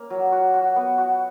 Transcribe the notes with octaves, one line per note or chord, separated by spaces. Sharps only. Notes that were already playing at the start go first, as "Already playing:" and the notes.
Already playing: A#3 C#4
F#3
F#4
F#4
B3
F#4